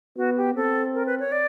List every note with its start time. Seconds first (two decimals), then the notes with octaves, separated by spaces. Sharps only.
0.17 B3 F#4
0.37 G4
0.56 C4 A4
0.94 A#4
1.06 B4
1.20 C#5
1.32 D5